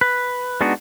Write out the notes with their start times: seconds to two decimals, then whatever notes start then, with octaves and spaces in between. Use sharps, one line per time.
0.01 B4
0.61 G#3 B3 D4 D#4 F#4